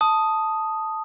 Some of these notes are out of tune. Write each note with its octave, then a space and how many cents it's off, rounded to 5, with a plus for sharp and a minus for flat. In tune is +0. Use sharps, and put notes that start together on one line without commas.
A5 +0 D#6 +0